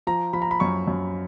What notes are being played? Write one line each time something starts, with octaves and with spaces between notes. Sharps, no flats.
F3 A#5
F3 B5
A#5
B5
F#2 C#6
F#2